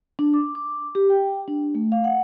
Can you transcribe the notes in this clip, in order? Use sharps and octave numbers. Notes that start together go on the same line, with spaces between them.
D4
D6
D6
G4
G5
D4
A3
F5
F#5